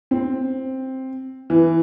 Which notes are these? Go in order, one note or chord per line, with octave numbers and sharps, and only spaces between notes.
C4
E3